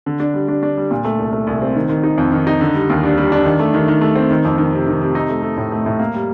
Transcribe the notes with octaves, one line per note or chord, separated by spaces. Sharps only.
D3
D4
G3
D4
D4
G3
A#2
A3
C2
A3
C2
C4
D#3
D#3
D#4
F2
D#3
D#4
D3
G3
D#2
D4
G3
D4
D#3
A3
D#3
D#3
A3
C4
D#3
F2
D#3
C3
D#3
C3
D#4
A3
A3
A2
A3
A2
A#3
G3